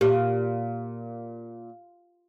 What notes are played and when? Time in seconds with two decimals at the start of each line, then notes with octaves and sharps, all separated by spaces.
0.01 A#2 G4